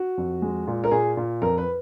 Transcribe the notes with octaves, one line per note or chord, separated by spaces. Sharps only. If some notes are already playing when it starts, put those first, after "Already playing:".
Already playing: F#4
F2
G#3
A#2
A#4
A#2 G#4
A#2
F2 A#4
B4